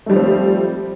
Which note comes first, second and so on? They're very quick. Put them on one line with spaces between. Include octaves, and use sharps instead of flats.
A3 G3 F3 C4